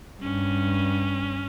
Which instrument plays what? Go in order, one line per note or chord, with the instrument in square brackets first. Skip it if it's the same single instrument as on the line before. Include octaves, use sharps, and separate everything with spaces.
[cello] G2 [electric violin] C#4